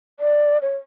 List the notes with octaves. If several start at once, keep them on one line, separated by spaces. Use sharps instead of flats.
D5
C#5